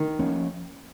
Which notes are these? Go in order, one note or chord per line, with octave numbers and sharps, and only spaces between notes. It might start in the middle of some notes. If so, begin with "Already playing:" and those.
Already playing: D#3
F3 A#3 C#4